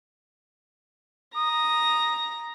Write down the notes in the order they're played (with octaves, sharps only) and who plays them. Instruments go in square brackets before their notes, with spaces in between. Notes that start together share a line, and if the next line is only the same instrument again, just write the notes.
[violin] A#5 A#6 [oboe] D#6